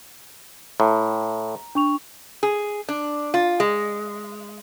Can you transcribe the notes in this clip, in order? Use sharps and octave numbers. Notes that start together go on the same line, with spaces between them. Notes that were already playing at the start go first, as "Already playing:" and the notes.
A2 A#5
D4 C#6 F7
G#4
D4
F4
G#3